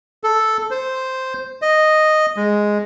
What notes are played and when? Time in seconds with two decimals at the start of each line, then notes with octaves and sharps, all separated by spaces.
0.24 A4
0.71 C5
1.62 D#5
2.37 G#3